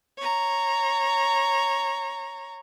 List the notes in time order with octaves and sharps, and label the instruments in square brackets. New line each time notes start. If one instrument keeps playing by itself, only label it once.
[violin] C#5 A#5